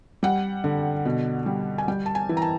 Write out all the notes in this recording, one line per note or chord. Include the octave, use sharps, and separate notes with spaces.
G3 F#5
D3
B2
G3
G#5
G3 G5
A5
G#5
E3
A#5
A5